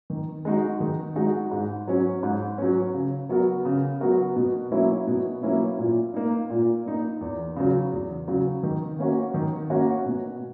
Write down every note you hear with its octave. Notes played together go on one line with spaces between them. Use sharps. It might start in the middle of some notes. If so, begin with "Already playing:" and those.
D#3
G#3 D#4 F#4
D#3
G#3 D#4 F#4
G#2
F#3 C#4
G#2
F#3 C#4
C#3
F#3 B3 F#4 A#4
C#3
F#3 B3 F#4 A#4
B2
F#3 A#3 C#4 E4
B2
F#3 A#3 C#4 E4
A#2
A#3 D#4
A#2
A#3 D#4
E2
C#3 F#3
E2
C#3 F#3
D#3
A#3 C#4 F#4
D#3
A#3 C#4 F#4
B2